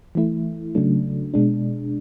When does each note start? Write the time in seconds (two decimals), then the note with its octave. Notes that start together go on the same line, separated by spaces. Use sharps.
0.15 E3 A3 E4
0.75 C#3 F#3 A3 D4
1.34 B2 G#3 D4